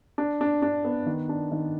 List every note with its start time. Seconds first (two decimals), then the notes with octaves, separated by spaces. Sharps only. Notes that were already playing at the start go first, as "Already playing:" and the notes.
0.18 D4
0.41 D4
0.62 D4
0.85 B3
1.06 D#3
1.29 D4
1.51 D#3